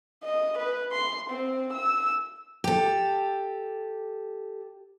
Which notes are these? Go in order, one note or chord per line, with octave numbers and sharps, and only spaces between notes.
D#5
B4
C6
C4
E6
G4 A4